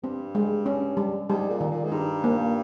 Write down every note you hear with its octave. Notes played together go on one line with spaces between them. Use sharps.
G2 C4
G#3
C#4
G3
G#2 G3
A#2
D#3
A#2
G#2
G2 D#4
A#3